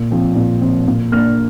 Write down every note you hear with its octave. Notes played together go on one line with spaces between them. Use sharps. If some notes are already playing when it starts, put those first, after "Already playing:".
Already playing: A#2
F3 C4
A#2
F3 C4
A#2
A#3 D4 F6